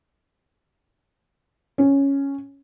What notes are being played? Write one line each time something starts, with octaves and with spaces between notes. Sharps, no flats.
C#4